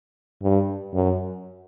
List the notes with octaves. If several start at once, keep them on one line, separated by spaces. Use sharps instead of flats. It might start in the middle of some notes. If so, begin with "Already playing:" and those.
G2
F#2